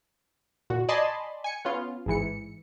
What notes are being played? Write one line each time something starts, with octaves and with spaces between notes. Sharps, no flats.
A#2 F#4
D5 D#5 G#5 A5 B5 C6
G#5 C#7
B3 C#4 F4
A1 G#2 E3 C#7